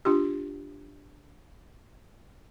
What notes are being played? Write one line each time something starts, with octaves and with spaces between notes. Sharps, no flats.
D4 F4 G4